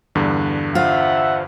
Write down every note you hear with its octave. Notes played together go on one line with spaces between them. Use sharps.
E2 G2 D3
F4 C5 E5 F#5